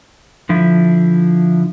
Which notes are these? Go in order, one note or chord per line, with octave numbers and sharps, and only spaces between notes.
D3 F3 E4